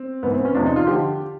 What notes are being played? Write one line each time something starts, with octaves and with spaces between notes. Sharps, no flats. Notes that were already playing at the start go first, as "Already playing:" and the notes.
Already playing: C4
G#2 E3 B3
C4
C#4
E2 C3 F3 D4
D#4
F4
D3 F3 G4